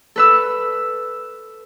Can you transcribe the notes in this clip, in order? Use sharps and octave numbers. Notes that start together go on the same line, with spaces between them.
A4 B4 E6